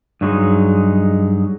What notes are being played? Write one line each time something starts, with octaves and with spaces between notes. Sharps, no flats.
G2 F#3 G#3 D#4